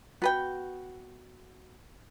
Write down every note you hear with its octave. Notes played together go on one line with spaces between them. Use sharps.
B3 F#4 B4 G5